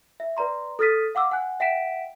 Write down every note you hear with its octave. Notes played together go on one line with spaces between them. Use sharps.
E5
B4 D5 A#5 C6
A4 D#6 F6 A6 B6 D#7
F5 F#5 D6 E6
F#5 G#5 F#6
E5 F#5 G5 B6 D7 E7